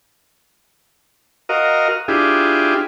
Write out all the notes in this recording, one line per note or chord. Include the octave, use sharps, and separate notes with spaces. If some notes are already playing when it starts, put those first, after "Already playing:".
F#4 A#4 D#5 F5
D4 E4 F4 G4 G#4